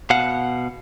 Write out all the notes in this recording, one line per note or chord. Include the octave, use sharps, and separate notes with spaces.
B2 F5 F#5